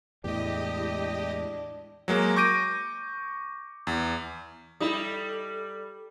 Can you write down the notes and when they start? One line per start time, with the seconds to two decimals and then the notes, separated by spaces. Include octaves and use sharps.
0.24 E2 A2 G#3 D4 E4 G4 D#5
2.08 F#3 G#3 A#3
2.36 C#6 D6 G6 A#6 D7 D#7
3.87 E2
4.80 G3 D#4 E4 A4 D5 B5 D#6